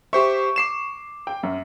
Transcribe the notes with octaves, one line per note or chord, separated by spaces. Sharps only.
G4 C5 E5 C#6
D6 C7 E7
G5
F#2